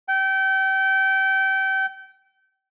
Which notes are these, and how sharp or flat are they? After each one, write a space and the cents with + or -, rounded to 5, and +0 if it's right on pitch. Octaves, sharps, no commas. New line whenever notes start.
G5 -30